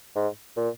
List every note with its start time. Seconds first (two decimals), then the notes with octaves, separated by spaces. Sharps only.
0.16 G#2
0.57 A#2